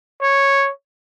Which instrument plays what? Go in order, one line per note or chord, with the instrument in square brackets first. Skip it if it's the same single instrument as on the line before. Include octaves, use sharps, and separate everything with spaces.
[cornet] C#5